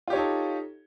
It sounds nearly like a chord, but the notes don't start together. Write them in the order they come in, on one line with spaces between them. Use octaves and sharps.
F4 G4 C#5 D#4 A4